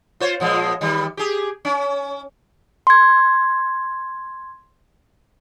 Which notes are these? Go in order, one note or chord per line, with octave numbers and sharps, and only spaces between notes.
F4 C5 C#5
A#2 F3 G#3
D#3 G3
G4 G#4
C#4
C6 G#6